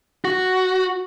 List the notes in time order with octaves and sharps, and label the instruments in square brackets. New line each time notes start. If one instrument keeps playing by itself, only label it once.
[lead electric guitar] F#4